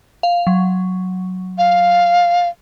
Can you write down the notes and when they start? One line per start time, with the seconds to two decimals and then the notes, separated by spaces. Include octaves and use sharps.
0.23 F5
0.47 F#3
1.58 F5